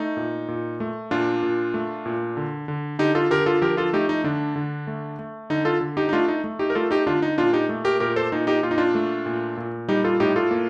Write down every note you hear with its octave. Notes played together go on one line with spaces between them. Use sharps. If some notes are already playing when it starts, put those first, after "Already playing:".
Already playing: A3 D#4
A#2
A#2
A3
A#2 D4 F4
A#2
A3
A#2
D3
D3
D3 D#4 G4
F4 A4
D3 G4 A#4
F4 A4
F3 G4 A#4
F4 A4
A3 D#4 G4
D#4
D3 D4
D3
A3
A3
D3 D#4
F4 A4
D3
D#4 G4
D#4
A3 D4 F4
D#4
A3
D#4 G4
A#4
A3 F4 A4
D#4 G4
D3 D4 F4
D#4
A#2 D4 F4
D#4 G4
A3
G4 A#4
A#2 G4 A#4
A4 C5
A#2 D#4
D#4 G4
A#2 F4
D#4
D4 F4
A3
A#2
A#2
G3 D#4 G4
F4 A4
A2 D#4 G4
F4 A4
A#3